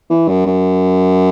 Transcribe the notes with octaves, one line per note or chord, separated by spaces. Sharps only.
E3
F#2
F#2